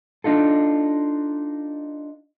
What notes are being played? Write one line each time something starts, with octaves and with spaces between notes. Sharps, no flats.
D4 D#4 F4 A4